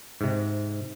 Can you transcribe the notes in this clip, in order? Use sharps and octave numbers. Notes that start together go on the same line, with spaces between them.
G#2 C3